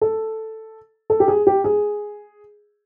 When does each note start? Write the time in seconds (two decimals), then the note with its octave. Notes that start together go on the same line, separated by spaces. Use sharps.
0.01 A4
1.10 A4
1.20 G4
1.28 G#4
1.47 G4
1.64 G#4